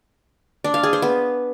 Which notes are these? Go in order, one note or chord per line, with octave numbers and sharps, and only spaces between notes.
D4
F5
G#4
C5
B3